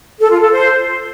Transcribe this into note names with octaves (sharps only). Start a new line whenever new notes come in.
A4
F4
A4
C5